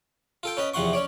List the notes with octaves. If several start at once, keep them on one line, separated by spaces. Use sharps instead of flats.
F4 A4 G5
C#4 B4 D#5
E2 C3 F3 F#5 C6 C#6
C#4 C#5 D5